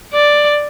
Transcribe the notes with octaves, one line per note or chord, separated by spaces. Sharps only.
D5